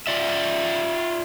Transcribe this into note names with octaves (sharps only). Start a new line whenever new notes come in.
F4 D5 E5